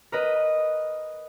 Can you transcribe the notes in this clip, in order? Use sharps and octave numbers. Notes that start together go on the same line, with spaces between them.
A#4 B4 D#5